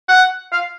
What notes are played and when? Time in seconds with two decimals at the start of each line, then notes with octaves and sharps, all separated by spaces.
0.09 F#5
0.52 F5